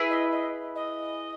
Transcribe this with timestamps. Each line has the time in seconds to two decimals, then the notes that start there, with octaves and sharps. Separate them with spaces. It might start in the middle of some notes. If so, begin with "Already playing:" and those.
Already playing: E4 G#4 B4
0.10 D#5
0.31 D#5
0.75 D#5